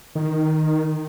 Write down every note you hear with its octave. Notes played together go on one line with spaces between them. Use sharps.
D#3